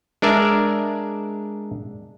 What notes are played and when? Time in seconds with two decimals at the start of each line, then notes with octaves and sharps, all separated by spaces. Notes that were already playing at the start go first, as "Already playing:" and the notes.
0.22 G#3 D4 A#4 D5 E5